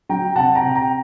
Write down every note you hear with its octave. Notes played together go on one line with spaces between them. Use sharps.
F#3 G5 A#5
C3 F#5 A5
G5 A#5
C3
G5 A#5